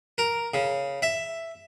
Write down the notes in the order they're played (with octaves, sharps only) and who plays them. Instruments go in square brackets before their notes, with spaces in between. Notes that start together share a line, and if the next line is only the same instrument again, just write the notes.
[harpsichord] A#4
C#3
E5